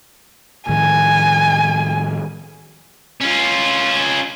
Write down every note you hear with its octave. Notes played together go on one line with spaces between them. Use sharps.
A2 D#3 F3 G#5
C#4 F4